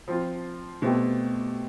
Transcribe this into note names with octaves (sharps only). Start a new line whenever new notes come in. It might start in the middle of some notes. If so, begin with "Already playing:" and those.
F3 C4 F4
B2 A3 C4 G4